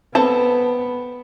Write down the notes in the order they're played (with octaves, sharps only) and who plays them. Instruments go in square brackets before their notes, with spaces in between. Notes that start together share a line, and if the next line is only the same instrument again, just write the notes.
[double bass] B3 [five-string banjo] C4 A4 A5